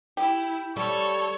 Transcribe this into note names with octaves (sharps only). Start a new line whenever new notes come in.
E4 G4
G3 A4 C#5 C#6